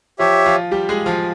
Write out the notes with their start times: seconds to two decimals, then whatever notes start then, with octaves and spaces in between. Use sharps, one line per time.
0.19 F3 F4 G4 C#5 E5
0.45 F3 F4
0.71 G3 G4
0.89 G#3 G#4
1.06 F3 F4